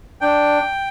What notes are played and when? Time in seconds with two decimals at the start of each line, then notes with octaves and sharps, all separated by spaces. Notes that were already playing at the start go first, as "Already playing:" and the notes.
0.21 D4 G5